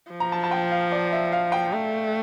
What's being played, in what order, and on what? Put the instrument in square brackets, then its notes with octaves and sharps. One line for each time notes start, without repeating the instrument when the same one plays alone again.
[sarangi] F3
[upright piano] A#5
A5
A5
G5
F5
D5
E5
F5
G5
[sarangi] A3